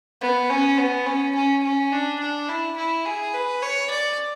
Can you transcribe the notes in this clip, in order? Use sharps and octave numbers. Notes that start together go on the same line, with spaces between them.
B3
C#4
B3
C#4
C#4
C#4
D4
D4
E4
E4
G#4
B4
C#5
D5